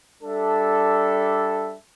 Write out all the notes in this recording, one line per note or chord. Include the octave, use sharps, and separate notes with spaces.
G3 D4 A4 E5